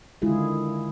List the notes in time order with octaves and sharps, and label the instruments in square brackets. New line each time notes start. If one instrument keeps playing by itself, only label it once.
[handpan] D3 D#3 G#3 E4 F4 G#4